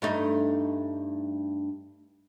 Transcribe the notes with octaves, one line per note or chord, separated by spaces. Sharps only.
G2 A3 D#4